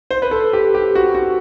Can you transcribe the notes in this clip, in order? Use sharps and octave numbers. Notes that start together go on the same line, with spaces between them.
C5
B4
A4
G4
G4
F#4
F#4